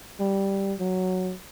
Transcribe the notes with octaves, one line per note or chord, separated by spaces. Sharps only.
G3
F#3